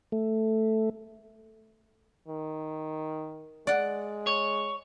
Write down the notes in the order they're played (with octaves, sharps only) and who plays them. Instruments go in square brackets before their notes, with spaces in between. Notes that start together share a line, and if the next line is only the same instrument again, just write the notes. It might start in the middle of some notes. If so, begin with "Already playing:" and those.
[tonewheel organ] A3
[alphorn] D#3
[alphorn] G#3 [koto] D5 F#5
[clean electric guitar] C#5